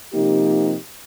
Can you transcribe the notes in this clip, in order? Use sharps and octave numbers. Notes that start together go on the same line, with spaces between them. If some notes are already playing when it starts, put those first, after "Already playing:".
C3 F3 A#3 D#4 G4